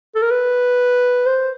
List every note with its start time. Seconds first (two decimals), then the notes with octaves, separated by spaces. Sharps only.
0.15 A4
0.22 A#4
0.30 B4
1.26 C5